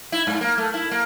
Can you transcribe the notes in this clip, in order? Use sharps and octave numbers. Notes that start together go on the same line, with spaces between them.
E4
G#2
A#3
A3
E4
A#3